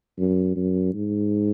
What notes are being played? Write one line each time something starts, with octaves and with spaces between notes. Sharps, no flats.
F#2
F#2
G#2